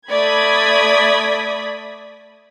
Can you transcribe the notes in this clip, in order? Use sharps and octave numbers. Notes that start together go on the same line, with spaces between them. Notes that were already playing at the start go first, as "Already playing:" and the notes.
A3 D5 B5 D#6 G#6 B6